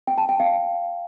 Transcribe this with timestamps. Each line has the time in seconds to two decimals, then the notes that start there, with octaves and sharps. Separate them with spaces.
0.07 G5
0.18 A5
0.29 G5
0.40 F5